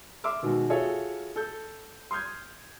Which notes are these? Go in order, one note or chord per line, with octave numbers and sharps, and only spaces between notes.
E5 C6 D6 E6 F6
B2 D#3 G#3 F#4
F4 F#4 G#4 A4 C#5 E5
A4 G6
C6 D#6 F6 G6 G#6